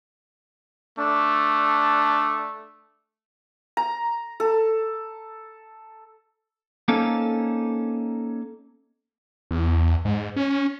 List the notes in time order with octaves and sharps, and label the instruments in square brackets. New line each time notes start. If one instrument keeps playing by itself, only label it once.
[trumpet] A3 [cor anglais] D4
[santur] A#5
A4
[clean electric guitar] A#3 C4 C#4 D#4 A4 F5
[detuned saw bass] E2
G#2
C#4